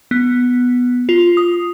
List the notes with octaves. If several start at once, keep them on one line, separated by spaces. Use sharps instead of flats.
B3
F4
D#6